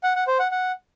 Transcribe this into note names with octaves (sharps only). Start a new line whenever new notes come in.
F#5
F#5
C5
F#5
F#5